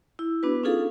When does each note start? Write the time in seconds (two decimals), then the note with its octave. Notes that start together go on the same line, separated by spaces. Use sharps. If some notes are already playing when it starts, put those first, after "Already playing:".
0.19 E4
0.43 B3 D4 F#4 B4
0.63 C#4 D#4 F4 G#4 A4 F5